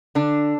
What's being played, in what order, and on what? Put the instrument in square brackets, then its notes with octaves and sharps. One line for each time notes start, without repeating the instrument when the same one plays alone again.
[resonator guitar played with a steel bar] D3 D4